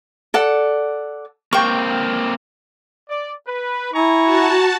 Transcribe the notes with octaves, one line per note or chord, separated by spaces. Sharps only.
A4 D5 F#5
A#3 C4 G5 C#6
D5
B4
E4 G#5 A#5 C#6
F#4 A5